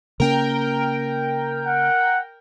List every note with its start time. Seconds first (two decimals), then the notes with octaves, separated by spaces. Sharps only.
0.20 C#3 A#3 C#4 A#4 G5
1.67 F#5